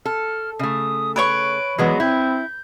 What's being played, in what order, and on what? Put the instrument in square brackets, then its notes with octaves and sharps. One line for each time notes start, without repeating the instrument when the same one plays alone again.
[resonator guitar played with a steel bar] A4 [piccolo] F6
[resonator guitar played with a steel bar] C#3 A3 [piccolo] D#6
[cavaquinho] B4 C#5 C#6 [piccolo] D7
[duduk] E3 [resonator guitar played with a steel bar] F#3 G#3 B3
[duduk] C4 [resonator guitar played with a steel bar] E4 [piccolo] G6